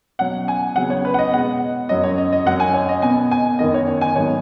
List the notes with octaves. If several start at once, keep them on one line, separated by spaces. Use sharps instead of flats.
B2 F#3 C#4 F#5
G#5
C#3 F#3 B3 F#5
C#5
B4
F#5
D#5
B2 G#3 B3 F#5
F#2 F#3 C#4 D#5
C#5
D#5
D#5
F#2 F#3 C#4 F#5
G#5
C#5
D#5
B2 B3 G#5
G#5
F#2 D#3 B3 D#5
C#5
C#5
G#5
G#2 D#3 F#3 B3 C#5